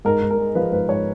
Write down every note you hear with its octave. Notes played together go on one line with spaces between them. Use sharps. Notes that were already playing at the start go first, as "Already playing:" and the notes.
G#2 A#4
G#2
A#4
G#3
F3 B4
G#2 B4
G#2 C#5